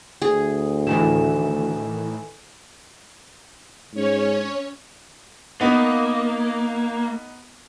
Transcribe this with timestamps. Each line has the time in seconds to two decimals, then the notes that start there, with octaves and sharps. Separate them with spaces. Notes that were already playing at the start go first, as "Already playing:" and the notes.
0.22 D2 G#4
0.87 A2 D#3 E3 A4 G#5 E7
3.95 G#2 C#4 C#5
5.61 A#3 B3 D#4